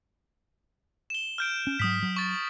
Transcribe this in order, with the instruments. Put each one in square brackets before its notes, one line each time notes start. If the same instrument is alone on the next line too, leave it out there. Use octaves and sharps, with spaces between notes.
[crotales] E7 G7
F6 G6 D7
[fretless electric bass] C#4
[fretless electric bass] G#2 F#3 [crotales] D#6 B6
[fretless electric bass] F#3
[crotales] C#6 A6